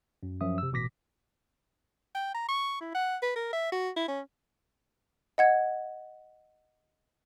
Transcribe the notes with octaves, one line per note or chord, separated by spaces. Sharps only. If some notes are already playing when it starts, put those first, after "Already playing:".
F#2
F#2 F3 E5 D#6
C3 E6
A1 B2 D6 A#6 B6
G5
A#5
C#6
E4
F#5
B4
A#4
E5
F#4
E4
C#4
D#5 F#5 G#6